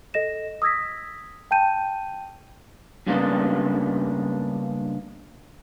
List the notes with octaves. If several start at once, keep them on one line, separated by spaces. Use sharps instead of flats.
A4 D#5 A#6 E7
D#6 E6 G#6 A#6 B6
G5 A5 G6 D#7
G2 C#3 G#3 A#3 B3 D4